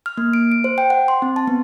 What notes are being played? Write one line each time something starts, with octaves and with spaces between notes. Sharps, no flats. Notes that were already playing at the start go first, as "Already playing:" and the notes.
F6
A#3
D7
D7
C5
G5
F#5
C6
C4
A5
B3